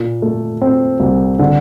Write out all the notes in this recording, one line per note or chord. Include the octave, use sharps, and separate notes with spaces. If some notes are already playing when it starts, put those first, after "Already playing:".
Already playing: A#2
A3
C4
C2
D3